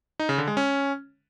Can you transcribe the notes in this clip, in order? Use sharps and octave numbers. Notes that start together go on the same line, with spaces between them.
D#4
C#3
D3
G#3
C#4